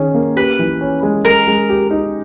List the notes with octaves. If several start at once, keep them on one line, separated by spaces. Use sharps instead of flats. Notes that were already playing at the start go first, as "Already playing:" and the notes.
Already playing: D#3 C#4 G#4
A#3
G4 B4
E3
C#4
G#3
G#3 A#4
G#3
G4
D#4